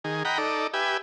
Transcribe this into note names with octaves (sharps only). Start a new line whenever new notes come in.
D#3 G#4
D#5 F#5 G5 A#5 B5
D#4 A4 D5
G4 B4 E5 G#5